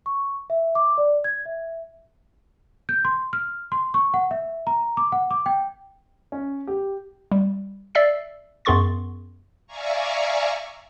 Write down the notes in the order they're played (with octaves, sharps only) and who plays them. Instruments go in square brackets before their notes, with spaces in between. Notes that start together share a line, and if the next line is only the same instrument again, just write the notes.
[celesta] C#6
E5
D6
D5
G#6
E5
G6
C6
F6
C6
C#6
F#5
E5
A#5
D6
F#5
D6
G5
[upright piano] C#4
G4
[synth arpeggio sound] G3
D5 E5 E6 A6 C7
F#2 B3 G#4 C6 C#6 A6
[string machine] D5 E5 F5 G#5 A#5 C#6